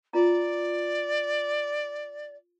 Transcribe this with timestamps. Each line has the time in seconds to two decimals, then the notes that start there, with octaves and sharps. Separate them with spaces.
0.13 F4 D5 A#5